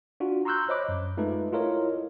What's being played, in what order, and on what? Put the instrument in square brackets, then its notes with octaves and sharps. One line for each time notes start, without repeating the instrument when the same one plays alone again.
[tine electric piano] D4 F4 F#4
A#5 C6 C#6 E6 F#6 G6
C5 C#5 D#5 B5 D6 F#6
F#2
G#3 A3 D#4 F4 A4 B4
E4 F4 A4 A#4 C#5 D#5